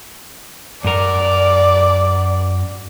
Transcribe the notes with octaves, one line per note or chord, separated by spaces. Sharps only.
F#2 A#4 D5